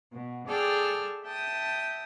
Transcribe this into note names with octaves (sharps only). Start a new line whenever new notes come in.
B2
G#4 A4 D5 G5 F6
E5 G5 A5 D#6